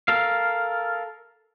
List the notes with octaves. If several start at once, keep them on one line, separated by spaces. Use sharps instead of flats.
A4 A#4 F5